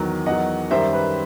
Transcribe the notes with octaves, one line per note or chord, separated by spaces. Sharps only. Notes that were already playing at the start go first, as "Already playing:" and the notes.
Already playing: E2 D#3 F#3
E2 D#3 F#3 D#5 F#5
F#2 D#3 G3 C5 E5
B4